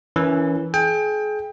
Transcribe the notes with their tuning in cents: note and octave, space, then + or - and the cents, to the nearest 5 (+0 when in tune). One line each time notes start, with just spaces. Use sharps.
E3 +0 C#4 +20 A#4 +0
G#4 +35 G5 +25